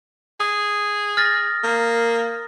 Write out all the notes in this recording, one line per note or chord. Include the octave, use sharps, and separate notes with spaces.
G#4 D#6
F6 A6 A#6
A#3